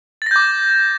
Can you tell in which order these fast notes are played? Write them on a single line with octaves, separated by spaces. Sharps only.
A6 A#6 G6 D6